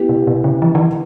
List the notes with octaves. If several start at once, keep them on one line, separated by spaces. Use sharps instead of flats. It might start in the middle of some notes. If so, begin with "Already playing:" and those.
Already playing: B3 E4 G4
B2
B2
C#3
E3
D#3
E3